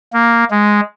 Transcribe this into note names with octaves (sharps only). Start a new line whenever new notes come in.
A#3
G#3